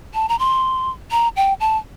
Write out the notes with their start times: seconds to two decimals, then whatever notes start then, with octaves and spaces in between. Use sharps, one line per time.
0.14 A5
0.29 A#5
0.39 C6
1.11 A#5
1.36 G5
1.60 A5